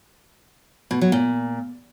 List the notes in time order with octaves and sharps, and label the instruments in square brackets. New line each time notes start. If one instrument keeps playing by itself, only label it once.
[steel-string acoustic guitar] B2
F#3
A#2